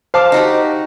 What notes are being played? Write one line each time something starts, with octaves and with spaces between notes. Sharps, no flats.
C5 F5 A5 D6
D#4 F#4 G4